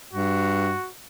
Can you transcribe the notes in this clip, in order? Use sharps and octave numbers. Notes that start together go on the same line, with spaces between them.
G2 F#4